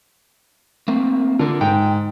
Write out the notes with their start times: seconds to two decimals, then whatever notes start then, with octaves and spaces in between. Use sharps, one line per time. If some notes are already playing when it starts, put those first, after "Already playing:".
0.88 A3 A#3 C4
1.39 D3 F4 A#4
1.61 G#2 G5